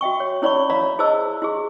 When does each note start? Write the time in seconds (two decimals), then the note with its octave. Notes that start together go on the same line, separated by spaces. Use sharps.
0.01 F#4 E5 G5 C#6
0.20 C#5
0.42 C#4 E4 C#5 D5 B5 C#6
0.70 C#5 D5 E5 F5 A#5 B5
0.99 E4 G#4 C5 D#5 A5 E6
1.42 E4 G4 G#4